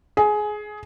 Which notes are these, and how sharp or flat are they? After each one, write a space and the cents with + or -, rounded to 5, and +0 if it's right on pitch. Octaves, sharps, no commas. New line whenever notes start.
G#4 +15